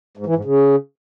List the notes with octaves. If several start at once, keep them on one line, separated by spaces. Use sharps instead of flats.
G#2
E3
G#2
C#3